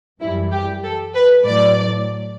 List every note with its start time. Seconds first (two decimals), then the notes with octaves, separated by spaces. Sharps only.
0.21 F#2 E3 G3 E4
0.52 G4
0.84 A4
1.15 B4
1.45 A2 F#3 D5